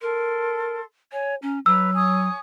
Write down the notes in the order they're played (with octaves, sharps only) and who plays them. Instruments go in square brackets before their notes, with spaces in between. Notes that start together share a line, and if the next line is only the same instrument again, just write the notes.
[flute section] A4 C6 [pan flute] A#4
[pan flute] C#5 [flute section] G#5
[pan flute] C#4 [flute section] A#5
[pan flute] F#3 [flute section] B4 A#5 [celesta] E6
[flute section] C#5 G#5 D#6